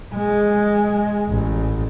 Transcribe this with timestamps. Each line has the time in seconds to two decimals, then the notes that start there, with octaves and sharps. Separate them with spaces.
0.14 G#3
1.28 A1